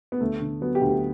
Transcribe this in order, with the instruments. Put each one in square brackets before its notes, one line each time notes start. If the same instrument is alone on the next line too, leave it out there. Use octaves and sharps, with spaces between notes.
[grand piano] B3
D2 A3
D3
F#3 B3
G4
D2
G4